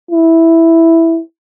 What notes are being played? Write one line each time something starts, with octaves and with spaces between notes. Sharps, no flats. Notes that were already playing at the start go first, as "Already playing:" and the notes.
E4